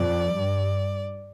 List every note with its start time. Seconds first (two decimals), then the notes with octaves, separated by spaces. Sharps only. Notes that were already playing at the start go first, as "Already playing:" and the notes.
Already playing: F2 D5
0.34 G2